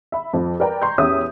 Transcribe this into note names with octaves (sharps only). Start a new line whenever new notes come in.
E5 B5
F2 F3
A#4 B4 D5 G5 A#5
A#5 C6 C#6 G6
E2 C#4 G4 E5 D#6